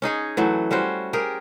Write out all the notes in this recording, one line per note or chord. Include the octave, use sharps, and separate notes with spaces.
C#4 D#4 G#4 C#5
E3 F#3 A3
G3 C#4 F#4 C5
G4 G#4 A#4